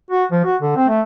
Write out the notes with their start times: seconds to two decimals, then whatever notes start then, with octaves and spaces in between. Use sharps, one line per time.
0.10 F#4
0.31 F3
0.45 F#4
0.62 D3
0.76 C4
0.88 A3